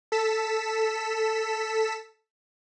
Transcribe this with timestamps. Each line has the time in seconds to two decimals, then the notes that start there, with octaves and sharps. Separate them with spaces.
0.12 A4 B6 E7